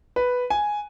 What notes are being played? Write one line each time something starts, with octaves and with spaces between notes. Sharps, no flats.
B4
G#5